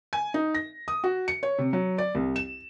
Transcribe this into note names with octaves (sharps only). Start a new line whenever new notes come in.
G#5
D#4
A#6
D#6
F#4
C#7
C#5
C3
F#3
D5
C2
E7